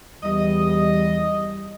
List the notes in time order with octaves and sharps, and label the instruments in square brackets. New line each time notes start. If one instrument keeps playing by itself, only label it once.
[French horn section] E2 E3 G3 [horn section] D#5